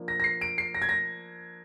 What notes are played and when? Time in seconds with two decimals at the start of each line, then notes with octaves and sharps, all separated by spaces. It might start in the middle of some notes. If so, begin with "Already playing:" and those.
Already playing: F3 A#3 D4
0.08 A#6
0.20 A#6
0.24 C7
0.41 D7
0.58 C7
0.75 A#6
0.82 G#6
0.89 A#6